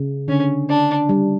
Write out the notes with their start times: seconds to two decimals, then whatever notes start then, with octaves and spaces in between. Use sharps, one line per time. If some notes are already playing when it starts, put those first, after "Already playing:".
Already playing: C#3
0.28 D3 C#4
0.69 D4
1.09 G3